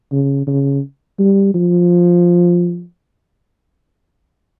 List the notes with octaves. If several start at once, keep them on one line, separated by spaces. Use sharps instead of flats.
C#3
C#3
G3
F3